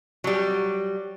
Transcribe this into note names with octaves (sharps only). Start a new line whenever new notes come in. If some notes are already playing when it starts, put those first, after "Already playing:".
F#3 G3